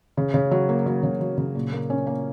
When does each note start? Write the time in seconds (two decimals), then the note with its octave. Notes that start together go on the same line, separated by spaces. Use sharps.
0.17 C#3
0.34 C#3
0.51 F#3
0.69 A#3
0.86 F#3
1.03 C#3
1.21 F#3
1.38 C#3
1.55 A#2
1.72 A#3
1.90 C#4
2.07 A#3